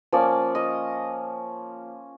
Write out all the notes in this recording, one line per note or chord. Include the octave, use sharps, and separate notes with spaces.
F3 A#3 C#4 D5
D#5